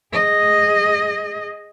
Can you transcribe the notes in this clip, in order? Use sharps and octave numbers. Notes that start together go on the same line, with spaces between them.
G#4 D#5